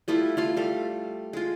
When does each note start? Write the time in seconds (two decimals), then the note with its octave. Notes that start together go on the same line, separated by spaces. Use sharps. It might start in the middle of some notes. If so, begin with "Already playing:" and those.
0.08 G3 A3 E4 F4
0.37 A3 F4 F5
0.56 G3 A4 F5
1.33 G#3 F4